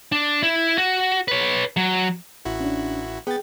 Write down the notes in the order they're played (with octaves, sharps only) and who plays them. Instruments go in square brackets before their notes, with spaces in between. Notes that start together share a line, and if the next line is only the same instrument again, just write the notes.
[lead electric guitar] D4
E4
F#4
B4 C#5
F#3
[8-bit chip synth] A1 E4 F#4
[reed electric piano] C#4 D4
[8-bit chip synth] B3 A6 [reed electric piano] G#4 G5